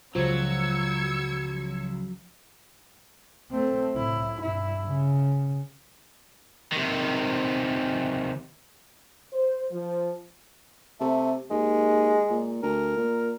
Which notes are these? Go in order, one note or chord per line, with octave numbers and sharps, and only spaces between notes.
C#2 F3 F#3 E6 G#6 C#7
A3 C4
A2 E4
G2 E4
C#3
C3 D#3
C5
F3
C3 A3
D#2 G#3
A#2
D2 A#4
A#2